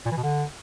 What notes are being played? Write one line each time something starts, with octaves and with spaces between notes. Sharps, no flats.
A#2
E3
B2
D3